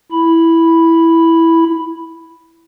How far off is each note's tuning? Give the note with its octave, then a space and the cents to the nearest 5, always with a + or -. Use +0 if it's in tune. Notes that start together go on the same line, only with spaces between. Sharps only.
E4 +0 B5 +0